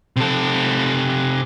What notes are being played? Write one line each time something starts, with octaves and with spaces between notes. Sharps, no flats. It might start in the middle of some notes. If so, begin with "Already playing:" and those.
C3 A4